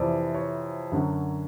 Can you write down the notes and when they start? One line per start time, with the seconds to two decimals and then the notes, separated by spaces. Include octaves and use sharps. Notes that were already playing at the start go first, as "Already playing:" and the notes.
Already playing: F2 C3 E3 D5
0.35 C#5
0.92 F#2 D3 F#3